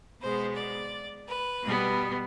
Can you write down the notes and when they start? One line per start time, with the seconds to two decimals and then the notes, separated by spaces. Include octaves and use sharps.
0.20 B2 G#3 B3 C5
0.56 D5
1.27 B4
1.62 B2 G3 B3